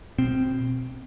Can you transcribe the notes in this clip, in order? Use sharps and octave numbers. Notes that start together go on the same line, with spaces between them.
B2 C4